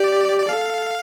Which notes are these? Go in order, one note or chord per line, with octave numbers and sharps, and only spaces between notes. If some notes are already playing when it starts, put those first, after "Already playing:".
Already playing: G4 D5
D5
A4 F5